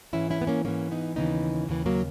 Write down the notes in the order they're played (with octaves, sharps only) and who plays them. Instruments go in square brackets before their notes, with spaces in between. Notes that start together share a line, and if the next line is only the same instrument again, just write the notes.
[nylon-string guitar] G#2 E3 C#4 E4
C#4 E4
B3
A#3 C#4
G#2 E3 A#3 C#4
B3 D#4
D#2 C#3 E3 B3 D#4
D#2 C#3 E3
F#3 A#3